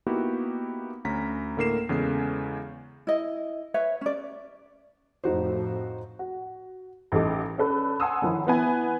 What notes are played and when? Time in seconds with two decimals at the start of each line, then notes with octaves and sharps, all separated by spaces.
0.07 A#3 B3 D#4 E4 F#4 G4
1.05 D2 C#4 A#5 B6
1.57 A2 D3 A#3 A#4 C7 E7
1.89 E2 C#3 G#3 A4 C7
3.07 E4 D#5
3.74 B4 C#5 E5
4.01 C#4 D5
5.24 F2 A2 D#4 F#4 C5
6.19 F#4
7.12 A1 G3 D#4 A4 D6
7.58 C#4 D4 A4 B4
8.00 F#5 G#5 A5 C6 D#6 E6
8.22 D3 D#3 F3 E4 C#5
8.47 E3 B3 G#5